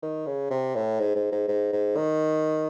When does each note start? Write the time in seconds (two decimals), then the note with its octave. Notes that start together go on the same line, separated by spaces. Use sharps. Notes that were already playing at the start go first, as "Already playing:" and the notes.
0.03 D#3
0.27 C#3
0.51 C3
0.75 A2
1.00 G#2
1.16 G#2
1.32 G#2
1.48 G#2
1.73 G#2
1.97 D#3